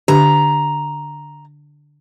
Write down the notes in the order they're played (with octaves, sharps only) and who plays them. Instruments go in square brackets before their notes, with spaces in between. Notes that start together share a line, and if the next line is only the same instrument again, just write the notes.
[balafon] D3 D4 G4 [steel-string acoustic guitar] A#5